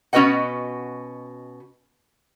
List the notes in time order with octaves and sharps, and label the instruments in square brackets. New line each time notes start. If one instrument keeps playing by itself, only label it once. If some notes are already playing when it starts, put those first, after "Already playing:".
[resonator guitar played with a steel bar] B2 C#4 F#4 B4 D#5 F#5